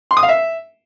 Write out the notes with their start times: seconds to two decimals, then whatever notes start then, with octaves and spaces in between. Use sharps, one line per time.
0.11 C6
0.17 D#6
0.23 F5
0.29 E5